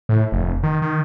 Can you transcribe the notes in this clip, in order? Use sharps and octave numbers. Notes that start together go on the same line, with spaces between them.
A2
F1
D#3
D#3